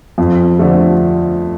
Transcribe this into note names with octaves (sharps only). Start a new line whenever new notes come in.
F2
D3 F3 A3